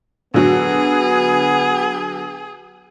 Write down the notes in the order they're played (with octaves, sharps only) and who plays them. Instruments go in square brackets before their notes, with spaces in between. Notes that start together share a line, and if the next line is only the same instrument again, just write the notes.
[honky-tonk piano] D3 F#3 [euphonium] B3 [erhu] G#4